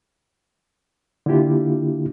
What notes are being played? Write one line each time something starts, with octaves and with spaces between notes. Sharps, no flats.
D3 A#3 D4 E4 F4 G4